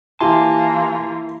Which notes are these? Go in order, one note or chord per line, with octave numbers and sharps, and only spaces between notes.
E3 A#3 E4 F4 G4 G#5 A5 C6